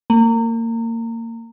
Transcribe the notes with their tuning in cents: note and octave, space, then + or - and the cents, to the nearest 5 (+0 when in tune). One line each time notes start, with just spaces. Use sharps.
A#3 -30